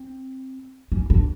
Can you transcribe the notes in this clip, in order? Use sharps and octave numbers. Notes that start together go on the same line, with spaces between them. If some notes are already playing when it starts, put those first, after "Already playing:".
Already playing: C4
C#4
D4